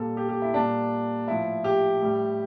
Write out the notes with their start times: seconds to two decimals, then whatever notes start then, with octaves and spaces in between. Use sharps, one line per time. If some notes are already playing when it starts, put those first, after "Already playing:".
Already playing: A#2 G3 A4
0.17 G4
0.29 G4
0.42 E4
0.54 A#2 G3 D4
1.27 A2 F3 E4
1.64 G4
2.01 A2 G3